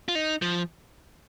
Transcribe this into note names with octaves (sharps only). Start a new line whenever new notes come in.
F4
D#4
F3